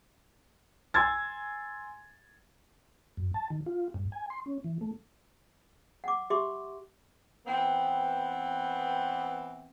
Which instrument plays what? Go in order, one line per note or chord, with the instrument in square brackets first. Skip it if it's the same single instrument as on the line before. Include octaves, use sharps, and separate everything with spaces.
[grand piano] G#5 C6 E6 G#6 A6
[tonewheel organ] F#2
A5
D#3
F4
G2
G#5
C6
C#4
E3
A3
[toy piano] F#5 D6
G4 E5 C6 D6
[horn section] E3 B3 C4